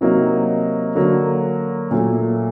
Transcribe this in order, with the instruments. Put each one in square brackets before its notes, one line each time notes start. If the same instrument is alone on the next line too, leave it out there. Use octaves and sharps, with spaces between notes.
[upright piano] C3 F#3 A#3 D#4
D3 F#3 A#3
A#2 F#3 A3